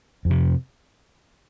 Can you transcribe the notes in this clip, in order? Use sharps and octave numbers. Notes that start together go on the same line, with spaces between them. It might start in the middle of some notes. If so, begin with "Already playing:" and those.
F2
C3